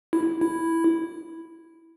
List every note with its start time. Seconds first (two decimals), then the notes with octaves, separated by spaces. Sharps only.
0.13 E4
0.41 E4